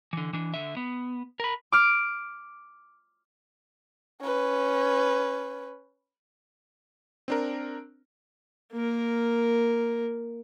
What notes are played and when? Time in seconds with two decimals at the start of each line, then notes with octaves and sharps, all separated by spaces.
0.13 D3 E3
0.33 E3 D4
0.54 D3 E5
0.77 B3
1.40 A#4 B5
1.72 D6 F6 D7
4.21 C#4 B4
7.28 C4 D4 A#4
8.73 A#3 A#4